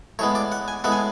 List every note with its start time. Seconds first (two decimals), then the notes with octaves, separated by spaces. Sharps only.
0.19 A2 G#3 B3 C#5
0.35 D5
0.52 F#5
0.68 G#5
0.84 A2 G#3 B3 F#5
0.92 G#5